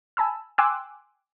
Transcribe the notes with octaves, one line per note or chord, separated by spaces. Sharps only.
G#5 A5 B5 E6
G5 G#5 C6 D6 E6 F#6